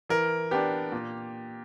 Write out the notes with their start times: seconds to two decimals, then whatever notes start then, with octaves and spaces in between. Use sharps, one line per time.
0.09 E3 A#4
0.51 B3 D4 G4
0.92 A#2